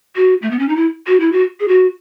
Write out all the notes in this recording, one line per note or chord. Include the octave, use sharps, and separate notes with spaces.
F#4
A3
B3
C#4
D#4
E4
F#4
E4
F#4
G#4
F#4